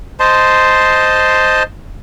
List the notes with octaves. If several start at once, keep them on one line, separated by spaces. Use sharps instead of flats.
C5 D#5 A5 C6